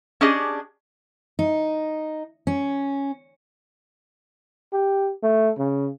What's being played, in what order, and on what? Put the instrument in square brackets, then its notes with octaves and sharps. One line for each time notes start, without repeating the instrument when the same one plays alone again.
[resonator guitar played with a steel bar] C#4 D4 G4 G#4 D#5
[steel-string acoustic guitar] D#4
C#4
[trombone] G4
A3
C#3